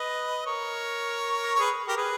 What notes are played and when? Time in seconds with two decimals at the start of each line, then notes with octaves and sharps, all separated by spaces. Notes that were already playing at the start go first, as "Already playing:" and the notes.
Already playing: B4 D#5
0.46 A#4 C#5
1.56 C#5
1.59 G#4 B4
1.88 G4 A#4
1.97 G#4 B4